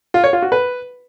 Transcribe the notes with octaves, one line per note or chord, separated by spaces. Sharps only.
F4
C#5
F4
F#4
B4